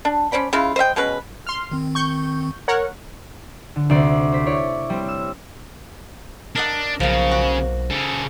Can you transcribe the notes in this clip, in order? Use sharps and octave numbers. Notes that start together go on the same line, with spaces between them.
D4
C#4 C5 D5 B5
C#3 G#3 E4 F4
C5 D#5 E5 G5
B2 G#3 C#4 B4
C6 F6
D#3 C4
C#6 G6
A#4 C#5 F#5
D3
D2 C3 A3 D5 C6
C5 B6
E4 C#5 D5
G3 C4
E6
D4 A#4 D#5 F#5
B1 C#3 F3 A#3
F#4
C#3 A4